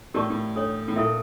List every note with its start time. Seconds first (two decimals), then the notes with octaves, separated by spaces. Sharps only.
0.14 A2 G4 A#4 D5 A5 C#6
0.30 A2
0.56 D4 A4 C#5
0.88 A2
0.96 A#2 E4 A4 E5